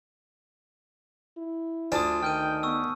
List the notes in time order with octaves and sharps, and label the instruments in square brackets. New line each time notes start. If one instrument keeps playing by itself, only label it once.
[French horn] E4
[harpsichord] D2 D4 [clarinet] F4 [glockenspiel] G#5 A5 D#6
[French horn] D#3 [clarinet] G5 [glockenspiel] F6 G6 D#7
[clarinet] B3 [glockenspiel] C#6 E6